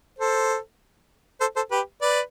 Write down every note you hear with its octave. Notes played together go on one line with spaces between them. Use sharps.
A4 C5
A4 C5
A4 C5
G4 B4
B4 D5